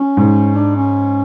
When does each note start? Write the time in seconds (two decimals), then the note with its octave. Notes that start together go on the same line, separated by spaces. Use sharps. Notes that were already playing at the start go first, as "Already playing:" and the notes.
Already playing: C#4
0.17 G#2
0.56 D4
0.76 C#4